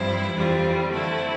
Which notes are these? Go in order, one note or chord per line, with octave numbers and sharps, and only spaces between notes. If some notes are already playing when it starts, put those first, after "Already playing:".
Already playing: G2 F3 C4 E4
F2 E3 G3 C4 F4
D3 A3 C4 E4